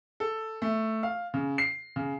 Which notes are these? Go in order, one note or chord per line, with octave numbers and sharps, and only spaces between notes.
A4
A3
F5
C#3
C7
C#3